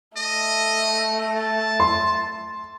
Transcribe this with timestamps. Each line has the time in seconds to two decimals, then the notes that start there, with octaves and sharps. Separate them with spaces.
0.18 A3 D#5
1.36 A5
1.80 C6